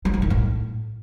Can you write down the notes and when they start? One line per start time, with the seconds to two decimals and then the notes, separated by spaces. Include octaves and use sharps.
0.05 F#3
0.14 F3
0.22 D#3
0.30 A2